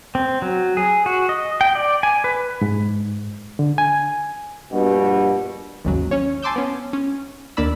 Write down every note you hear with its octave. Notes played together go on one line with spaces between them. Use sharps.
C4
F#3
G#4
F#4
D#5
G5
D5
G#5
B4
G#2
D3
G#5
A#1 G2 B2
G#1 D#2 C#3 F#3
C#4 C#5
G#5 A5 C6 D6 E6 G6
B3 C#4
C#4
D#2 A#3 D4 D5 B5 E6